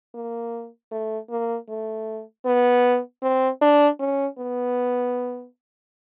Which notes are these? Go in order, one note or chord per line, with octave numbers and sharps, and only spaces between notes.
A#3
A3
A#3
A3
B3
C4
D4
C#4
B3